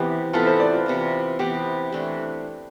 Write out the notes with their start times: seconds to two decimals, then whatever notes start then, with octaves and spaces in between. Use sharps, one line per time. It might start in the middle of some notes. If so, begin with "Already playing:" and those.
Already playing: C3 E3 B3 G4
0.33 C3 E3 B3 F4 A4
0.47 A4 C5
0.60 B4 D5
0.73 F4
0.86 C3 E3 B3
1.39 C3 E3 B3 G4
1.92 C3 E3 A3 D4